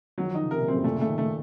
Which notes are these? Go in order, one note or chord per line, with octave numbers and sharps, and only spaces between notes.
D#3 F#3
F3
D#3 D#4
C#3
C3 A#4
A#2
F#2 C4
A2
A#2 A3
C#3
A3
D#3
C#3 A3